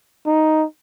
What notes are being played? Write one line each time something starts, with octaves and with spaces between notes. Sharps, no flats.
D#4